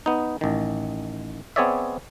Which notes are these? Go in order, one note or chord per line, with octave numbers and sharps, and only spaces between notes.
B3 D#4
A1 D#3
B3 C4 G#4 C#5 D5 E5